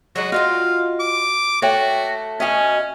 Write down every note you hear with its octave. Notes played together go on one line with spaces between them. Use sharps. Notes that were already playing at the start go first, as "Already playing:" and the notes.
F#3 G#3 F#4 D#5
F4 F#4 D#5 F5 G5
D6
A3 F#4 C#5 G5
B2 C#4 F#4 D#5 E5 G#5